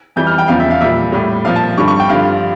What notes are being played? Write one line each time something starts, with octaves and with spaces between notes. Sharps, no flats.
F2 E3 G3 G6
F6
G5
E2 C#3 F3 F5
E5
F5
A#2 G3 E5
A2 G3
A#2 F3 F5
A5
G2 D3 G3 C#6
C#6
G5
G2 D3 F3 F5